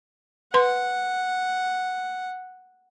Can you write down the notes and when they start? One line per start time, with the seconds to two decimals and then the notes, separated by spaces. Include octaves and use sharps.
0.54 B4 F#5 C6